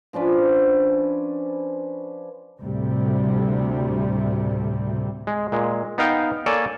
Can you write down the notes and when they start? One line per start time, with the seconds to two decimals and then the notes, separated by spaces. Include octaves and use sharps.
0.13 F3 C#4 D4 B4
2.61 D2 A2 C3 G3
5.27 G#3
5.52 A#2 G#3
5.98 B3 D#4 F5 G5
6.46 A#3 A4 C#5 D5 G#5 A5